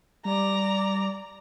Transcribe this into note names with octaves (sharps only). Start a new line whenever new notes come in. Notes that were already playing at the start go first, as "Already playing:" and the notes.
G3 D5 A#5